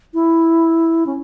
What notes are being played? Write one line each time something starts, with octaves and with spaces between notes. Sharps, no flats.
E4
C#4